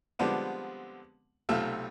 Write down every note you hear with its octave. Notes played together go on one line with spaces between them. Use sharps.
D3 F3 G3 G#3 B3 C4
B1 C3 A3 F4 E5